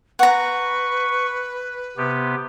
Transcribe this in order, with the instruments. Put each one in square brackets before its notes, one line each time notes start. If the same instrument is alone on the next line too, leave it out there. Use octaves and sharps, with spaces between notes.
[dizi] B4 [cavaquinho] F#5 A#5 [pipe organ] C#6
[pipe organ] C3 B3 G4